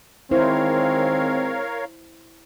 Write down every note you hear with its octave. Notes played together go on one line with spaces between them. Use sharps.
D#3 G#3 C4 E4 A#4 C5 C#5 F5